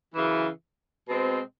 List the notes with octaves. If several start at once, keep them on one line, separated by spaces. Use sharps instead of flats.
F#2 C#3 E3
B2 G#3 C4